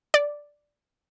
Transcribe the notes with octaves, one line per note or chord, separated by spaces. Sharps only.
D5